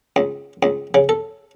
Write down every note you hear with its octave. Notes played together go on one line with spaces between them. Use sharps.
C#2
C#2
C#3
A4